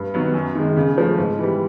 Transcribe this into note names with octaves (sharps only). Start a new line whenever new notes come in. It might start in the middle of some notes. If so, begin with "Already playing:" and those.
Already playing: G2
D#3 F#3 B3
F#2
D#3 G#3
C#3
F3 A3
G#2
E3 G3